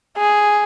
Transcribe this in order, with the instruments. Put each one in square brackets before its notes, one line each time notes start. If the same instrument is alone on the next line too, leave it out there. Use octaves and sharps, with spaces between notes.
[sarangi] G#4